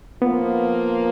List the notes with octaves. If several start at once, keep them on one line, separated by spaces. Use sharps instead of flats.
F3 A#3 B3 F4